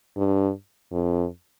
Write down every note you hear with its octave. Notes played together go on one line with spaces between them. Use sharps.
G2
F2